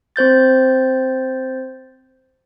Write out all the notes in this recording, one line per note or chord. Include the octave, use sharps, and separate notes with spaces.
C4 C5 G6 A6